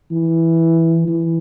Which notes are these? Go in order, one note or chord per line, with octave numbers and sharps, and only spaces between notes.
E3
E3